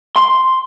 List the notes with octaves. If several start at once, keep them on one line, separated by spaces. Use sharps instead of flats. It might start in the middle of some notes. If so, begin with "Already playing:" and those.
C6